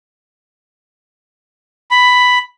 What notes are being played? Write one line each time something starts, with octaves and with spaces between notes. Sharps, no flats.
B5